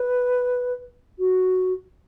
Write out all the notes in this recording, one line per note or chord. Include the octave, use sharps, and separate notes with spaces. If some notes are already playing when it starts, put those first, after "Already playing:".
Already playing: B4
F#4